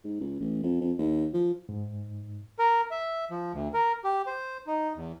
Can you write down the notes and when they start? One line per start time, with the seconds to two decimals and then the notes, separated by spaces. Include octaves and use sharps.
0.04 G#2
0.20 C#2
0.40 A1
0.63 F2
0.81 F2
0.99 D#2
1.34 F3
1.69 G#2
2.59 A#4
2.91 E5
3.31 F3
3.53 D2
3.73 A#4
4.04 G4
4.27 C5
4.67 D#4
4.96 E2